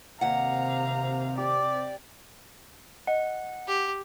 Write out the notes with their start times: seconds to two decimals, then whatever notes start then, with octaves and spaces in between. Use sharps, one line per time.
0.21 D#2 C3 F5 F#5 A#5
1.38 G4 D5
3.07 D#5 F#5
3.68 G4